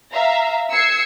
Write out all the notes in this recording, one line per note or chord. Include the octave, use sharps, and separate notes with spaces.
E5 F5 A#5
E6 G#6 C7 C#7